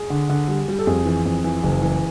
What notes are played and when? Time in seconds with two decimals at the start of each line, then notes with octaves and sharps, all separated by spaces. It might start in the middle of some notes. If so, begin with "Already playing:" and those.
Already playing: G#4
0.10 D3
0.29 D3
0.48 G3
0.68 G3
0.79 A4
0.87 F2 G#4
1.06 E3
1.25 F2
1.44 E3
1.63 F#1
1.82 E3